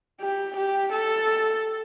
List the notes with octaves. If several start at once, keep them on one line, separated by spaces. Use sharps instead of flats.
G4
G4
A4